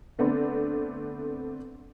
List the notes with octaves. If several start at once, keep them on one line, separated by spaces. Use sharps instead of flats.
D3 A3 B3 C4 D4